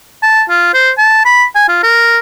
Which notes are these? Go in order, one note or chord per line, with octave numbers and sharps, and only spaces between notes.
A5
F4
C5
A5
B5
G#5
F4
A#4